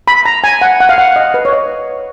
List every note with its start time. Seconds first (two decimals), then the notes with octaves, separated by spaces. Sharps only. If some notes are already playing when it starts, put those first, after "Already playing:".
0.08 B5
0.25 A#5
0.44 G#5
0.62 F#5
0.80 F#5
0.89 F5
0.98 F#5
1.16 D#5
1.34 B4
1.45 C#5
1.53 D#5